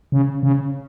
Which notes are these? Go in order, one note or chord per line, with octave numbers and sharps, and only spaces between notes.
C#3
C#3